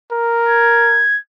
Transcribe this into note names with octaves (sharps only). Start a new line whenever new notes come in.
A#4
G#6